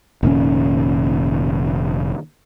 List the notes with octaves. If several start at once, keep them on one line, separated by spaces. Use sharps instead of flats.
F1 A#2 D#3 C#4